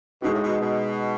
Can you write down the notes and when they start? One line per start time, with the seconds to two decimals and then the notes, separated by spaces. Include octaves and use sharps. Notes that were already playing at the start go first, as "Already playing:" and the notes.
0.22 B2 G#3 D#4 F#4
0.33 A2
0.43 B2
0.61 B2